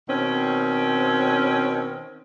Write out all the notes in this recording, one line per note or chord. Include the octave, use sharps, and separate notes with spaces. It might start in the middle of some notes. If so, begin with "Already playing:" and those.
B2 D#3 C4 C#4